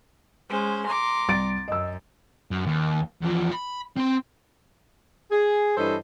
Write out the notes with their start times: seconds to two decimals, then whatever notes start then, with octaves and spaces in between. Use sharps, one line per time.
0.49 G#3 C#4 C5
0.85 A#5 C6 D6
1.28 C2 A6 D7
1.68 F#2 D#5 E6
2.51 F#2
2.66 D#2
3.21 E2 F3
3.52 B5
3.97 C4 C6
5.31 G#4
5.77 G2 E3 A4 C5 C#5 D#5